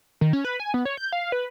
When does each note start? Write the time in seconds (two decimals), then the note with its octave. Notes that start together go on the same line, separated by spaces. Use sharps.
0.21 D#3
0.33 C#4
0.45 B4
0.60 G#5
0.74 B3
0.85 C#5
0.97 G6
1.13 F5
1.32 B4